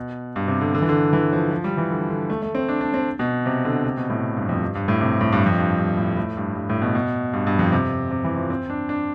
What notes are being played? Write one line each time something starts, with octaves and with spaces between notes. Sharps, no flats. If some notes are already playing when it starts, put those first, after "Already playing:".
Already playing: B2
G2
C3
D3
D3
E3
D3
E3
F3
F3
G3
E3
D3
D3
A3
A3
C4
D4
D4
C4
B2
C3
D3
C3
B2
A2
G2
F2
G2
G2
A2
C3
A2
G2
F2
G2
G2
A2
A2
G2
G2
A2
B2
B2
G2
G2
F2
C3
C3
E3
F3
C4
D4
D4